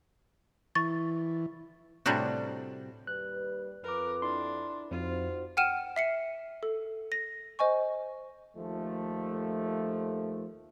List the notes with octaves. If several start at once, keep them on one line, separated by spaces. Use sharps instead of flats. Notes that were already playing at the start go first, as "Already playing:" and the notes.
E3 C#6 A6
A2 C3 G3 D4 F#4
D#2 G3 B4 F#6
F2 A#4 B4 D6
D4 E4 C6
F2 D#4 F4 F#4 C5
F#5 G5 F6 D#7 E7
E5 C7 C#7
A4
A#6
C5 D#5 G#5 C#6
D#2 F3 A3